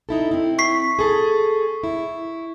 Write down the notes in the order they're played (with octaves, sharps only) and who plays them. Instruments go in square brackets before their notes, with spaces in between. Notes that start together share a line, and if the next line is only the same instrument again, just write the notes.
[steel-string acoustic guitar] D#4 E4 A4
C4 E4
[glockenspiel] C#6 B6 C7
[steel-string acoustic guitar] G#4 A4
E4